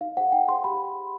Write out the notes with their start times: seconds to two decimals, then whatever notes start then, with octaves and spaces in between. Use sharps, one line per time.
0.01 D#4 F5
0.17 G#4 C5 F#5
0.32 D#4 G5
0.48 G#4 C5 C6
0.64 G4 B5